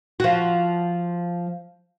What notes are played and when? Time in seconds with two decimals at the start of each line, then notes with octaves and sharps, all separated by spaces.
0.20 F3 F#4